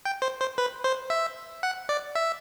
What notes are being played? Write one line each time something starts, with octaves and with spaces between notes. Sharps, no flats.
G5
C5
C5
B4
C5
E5
F#5
D5
E5